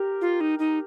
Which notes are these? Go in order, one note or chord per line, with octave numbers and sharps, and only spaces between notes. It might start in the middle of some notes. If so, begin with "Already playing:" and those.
Already playing: G4 A#4
F4
D#4
D#4